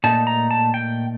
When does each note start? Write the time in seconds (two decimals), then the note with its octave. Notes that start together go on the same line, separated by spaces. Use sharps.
0.04 A#2 A3 D#4 A5
0.27 A#5
0.51 A5
0.74 G5